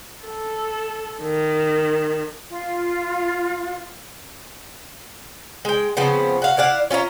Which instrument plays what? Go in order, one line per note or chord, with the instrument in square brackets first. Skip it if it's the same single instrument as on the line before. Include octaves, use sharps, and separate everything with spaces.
[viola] A4
D#3
[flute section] F4
[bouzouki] G#3 G5
C#3 F3 B3 C4
F#4 F5
E4 D5 F5 F#5
C#4 F4 E5 A#5